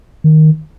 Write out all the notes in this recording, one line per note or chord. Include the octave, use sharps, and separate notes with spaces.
D#3